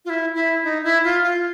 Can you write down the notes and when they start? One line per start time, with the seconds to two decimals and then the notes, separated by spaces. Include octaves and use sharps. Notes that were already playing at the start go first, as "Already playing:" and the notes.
0.05 F4
0.10 E4
0.35 E4
0.64 D#4
0.84 E4
1.04 F4
1.23 F4